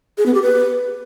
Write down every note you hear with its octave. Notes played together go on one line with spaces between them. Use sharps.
G#4
B3
G4
B4